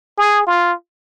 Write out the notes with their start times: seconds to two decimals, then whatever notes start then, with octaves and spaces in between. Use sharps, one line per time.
0.18 G#4
0.47 F4